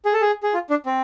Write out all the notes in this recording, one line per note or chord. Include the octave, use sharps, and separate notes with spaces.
G#4
A4
G#4
G#4
F4
D4
C4